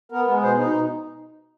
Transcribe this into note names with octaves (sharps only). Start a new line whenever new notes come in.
B3 A#4
G#3
B2 C5
D#4